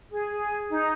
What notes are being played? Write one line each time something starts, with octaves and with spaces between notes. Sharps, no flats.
G#4
D#4